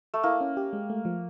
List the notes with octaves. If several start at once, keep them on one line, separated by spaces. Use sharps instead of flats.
A3
A#3 E4
C#4
G4
G#3
A3
F3